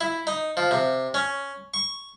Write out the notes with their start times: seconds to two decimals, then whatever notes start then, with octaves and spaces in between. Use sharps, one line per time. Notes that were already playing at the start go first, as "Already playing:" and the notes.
0.01 E4
0.27 D#4
0.57 F3
0.71 C3
1.14 C#4
1.74 C#6